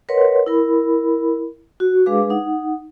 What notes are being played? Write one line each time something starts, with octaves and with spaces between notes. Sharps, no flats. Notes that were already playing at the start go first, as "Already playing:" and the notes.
A#4 B4 C#5 D#5 F#5 C6
E4 A#4 B5
F#4
G#3 D4 G#4 B4 F5 D6
D#4 F#5